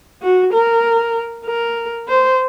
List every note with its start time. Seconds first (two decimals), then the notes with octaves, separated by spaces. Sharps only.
0.22 F#4
0.53 A#4
1.46 A#4
2.08 C5